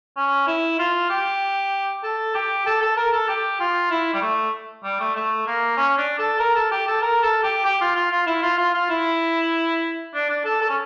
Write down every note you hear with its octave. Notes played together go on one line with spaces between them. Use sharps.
C#4
E4
F4
G4
A4
G4
A4
A4
A#4
A4
G4
F4
E4
G3
A3
G3
A3
A3
A#3
C#4
D4
A4
A#4
A4
G4
A4
A#4
A4
G4
G4
F4
F4
F4
E4
F4
F4
F4
E4
D4
D4
A4
A4
C#4